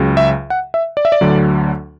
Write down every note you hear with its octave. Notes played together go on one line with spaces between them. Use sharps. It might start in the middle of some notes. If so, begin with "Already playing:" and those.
Already playing: C#2 C#3 F#3
E5
F#5
E5
D5
E5
D5
D2 D3 F#3